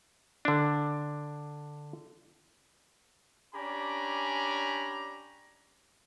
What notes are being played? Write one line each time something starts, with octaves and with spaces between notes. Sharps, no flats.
D3 D4
C#4 D4 G4 G#5 A#5 B5